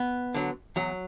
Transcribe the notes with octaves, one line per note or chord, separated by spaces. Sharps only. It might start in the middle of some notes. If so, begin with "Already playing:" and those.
Already playing: B3
D3 F#3
E2 F#3